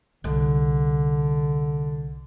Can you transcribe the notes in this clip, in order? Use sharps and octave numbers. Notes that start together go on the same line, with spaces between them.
C2 D3